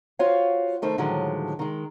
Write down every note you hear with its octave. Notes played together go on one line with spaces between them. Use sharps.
F4 F#4 C5 C#5 F5
D#3 A3 D#4 A#4 C5
A2 D3 D#3 F3 F#3 G#3
D#3 G#3